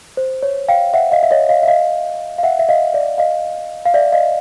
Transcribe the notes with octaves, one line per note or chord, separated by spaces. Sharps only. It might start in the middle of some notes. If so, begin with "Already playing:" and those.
C5
C#5
F5 G5
E5 F#5
D#5 F5
E5
C#5 D#5
D#5 F5
E5
D#5 F5
F5
E5 F#5
E5
D#5 F5
D5 E5
D#5 F5
F5
D5 E5
D#5 F5